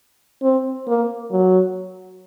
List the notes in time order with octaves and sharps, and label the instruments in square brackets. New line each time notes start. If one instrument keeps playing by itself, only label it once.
[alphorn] C4
A#3
F#3